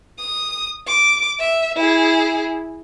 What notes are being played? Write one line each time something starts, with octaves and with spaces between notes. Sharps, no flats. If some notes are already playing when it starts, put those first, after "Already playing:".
D#6
D6
E5
E4 G#4